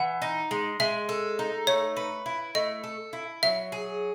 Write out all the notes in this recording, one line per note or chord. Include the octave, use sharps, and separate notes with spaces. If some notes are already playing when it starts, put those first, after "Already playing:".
Already playing: E3 F#5
D#4
G#3
G#3 E5
A4
D#4
A3 C#5
B4
E4
A3 D#5
A4
E4
F#3 E5
G#4